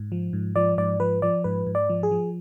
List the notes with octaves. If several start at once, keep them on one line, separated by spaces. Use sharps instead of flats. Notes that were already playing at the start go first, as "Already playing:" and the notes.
Already playing: G#2
F3
G#2
F3 D5
G#2 D5
F3 B4
F3 D5
G#2 B4
G#2
D5
F3
G#4
F3